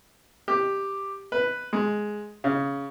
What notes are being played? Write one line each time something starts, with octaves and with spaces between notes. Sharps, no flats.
G4
B4
G#3
C#3